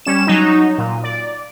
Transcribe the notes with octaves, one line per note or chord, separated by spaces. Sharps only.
G3 C#4 E7
F#3 D#4
A#2
D5